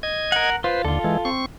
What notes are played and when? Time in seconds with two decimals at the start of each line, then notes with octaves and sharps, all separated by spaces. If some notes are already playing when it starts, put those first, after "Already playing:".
0.03 D#5 G#6
0.32 A#4 F#5
0.64 F4 B4 C5
0.85 D#2 D3 F4 A4
1.04 E3 G#3
1.25 C4 C#6